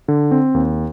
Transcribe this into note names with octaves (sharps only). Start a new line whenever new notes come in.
D3
C4
D#2